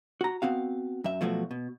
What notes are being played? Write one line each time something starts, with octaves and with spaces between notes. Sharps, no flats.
F#4 A#5
B3 C4 F#4 F5
F#2 E5
B2 F3 F#3 A3 F#4
B2